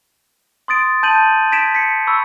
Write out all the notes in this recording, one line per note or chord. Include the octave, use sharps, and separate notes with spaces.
C6 D#6 A6 D7
A5 G6 D#7 F#7
G#6 B6 D7 E7
B6 C#7
B5 C#6 E6